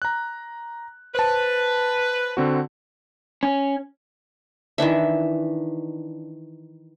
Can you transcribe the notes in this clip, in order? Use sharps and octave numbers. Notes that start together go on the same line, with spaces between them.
A#5 F#6
B4 C5 A5
D3 C4 F#4
C#4
D#3 E3 D4 E5